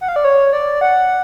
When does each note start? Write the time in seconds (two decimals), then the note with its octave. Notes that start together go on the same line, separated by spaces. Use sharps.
0.01 F#5
0.08 F5
0.16 D5
0.24 C#5
0.53 D5
0.81 F#5